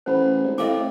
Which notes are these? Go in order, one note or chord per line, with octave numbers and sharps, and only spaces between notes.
A1 C5 F#5 B5
G#1
A2 C4 D#5 F5 D6